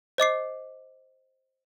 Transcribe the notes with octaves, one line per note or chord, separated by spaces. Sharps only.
C5 D#5 D6 C7